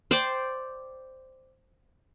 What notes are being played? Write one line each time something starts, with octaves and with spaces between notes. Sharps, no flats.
C5 D5 G5 D6